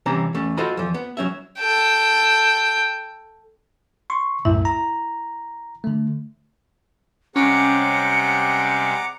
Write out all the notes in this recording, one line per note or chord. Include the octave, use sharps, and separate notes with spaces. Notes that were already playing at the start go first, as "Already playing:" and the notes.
C3 E3 G3 C4 C#4 A#5
E2 A3 C#4
F4 F#4 A4 C5 D#5 B5
E2 F3
B3
F#3 C#4 E5
A4 G5
C6 C#6
C2 F#2 A2 E4 E5
A#5
D3 A3
C3 G3 G#3 C#4 F#5 A#5 D6 C#7